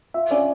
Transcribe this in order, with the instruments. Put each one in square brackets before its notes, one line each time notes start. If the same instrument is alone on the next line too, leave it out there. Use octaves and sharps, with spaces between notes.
[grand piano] F4 [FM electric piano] E5
[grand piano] C#4 [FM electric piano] D5